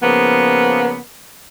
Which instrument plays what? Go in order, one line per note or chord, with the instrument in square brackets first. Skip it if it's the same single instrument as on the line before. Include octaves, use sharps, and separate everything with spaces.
[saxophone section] C#3 F3 A#3 B3